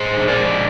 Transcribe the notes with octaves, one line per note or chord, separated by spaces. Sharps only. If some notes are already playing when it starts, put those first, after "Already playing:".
Already playing: A#2 G#4 C5
D4
A#4 D5
G#3